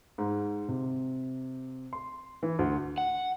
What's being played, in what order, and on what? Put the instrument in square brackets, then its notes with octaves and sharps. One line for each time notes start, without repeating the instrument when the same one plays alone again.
[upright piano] G#2
C3
C6
E3
D2
[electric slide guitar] F#5